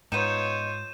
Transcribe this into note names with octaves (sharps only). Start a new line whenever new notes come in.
G#2 B3 D#4 F4 C#5 G6 D#7 E7